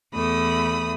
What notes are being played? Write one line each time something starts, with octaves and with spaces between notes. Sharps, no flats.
E2 A3 B5 D#6